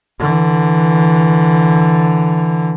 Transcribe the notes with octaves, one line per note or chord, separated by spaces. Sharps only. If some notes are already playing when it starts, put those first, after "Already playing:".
D3 E3